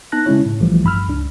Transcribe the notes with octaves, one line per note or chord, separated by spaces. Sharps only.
B3 D#4 A5 F#6 A#6
C#3 G#3 C#4 E4 C#5
A2
B1 E3 F3 G3 A3
G1 G2 B5 E6 F6
C#2 D4